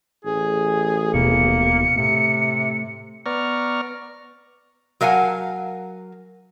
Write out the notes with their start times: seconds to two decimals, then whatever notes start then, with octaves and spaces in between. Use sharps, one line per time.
0.25 A1 G#4
1.14 D#1 B2 A#3 C#7
1.96 A2 C3
3.26 B3 D5 A#5 C#6 F6
5.01 F#3 A#4 F5 F#5 G#5